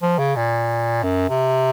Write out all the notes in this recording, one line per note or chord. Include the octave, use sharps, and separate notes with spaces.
F3
C#3
A#2
F#2
C3